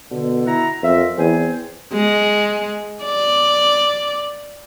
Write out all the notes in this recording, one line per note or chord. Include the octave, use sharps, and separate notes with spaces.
B2 D3
E4 F#5 A#5
F2 F4 A#4 E5
E2 C4 C5 G#5
G#3
D5